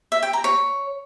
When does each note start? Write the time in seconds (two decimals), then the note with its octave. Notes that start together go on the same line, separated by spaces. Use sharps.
0.12 E5
0.23 G5
0.33 A#5
0.44 C#5